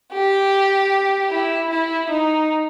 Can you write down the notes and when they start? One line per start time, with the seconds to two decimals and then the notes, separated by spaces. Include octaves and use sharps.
0.12 G4
1.30 E4
1.69 E4
2.08 D#4